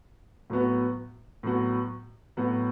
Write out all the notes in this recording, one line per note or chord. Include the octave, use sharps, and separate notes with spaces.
A2 F#3 B3 F#4
A2 F#3 B3 F#4
A2 F#3 B3 F#4